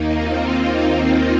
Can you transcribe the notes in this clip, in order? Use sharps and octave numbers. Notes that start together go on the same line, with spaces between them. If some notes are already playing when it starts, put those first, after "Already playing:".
Already playing: D#2 D#3 A#3 D#4
C4 F4